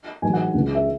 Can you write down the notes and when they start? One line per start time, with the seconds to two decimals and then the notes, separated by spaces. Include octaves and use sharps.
0.22 A1 G#2 F#3 G#5
0.33 F#5
0.54 C#2 C#3 G#3
0.75 E5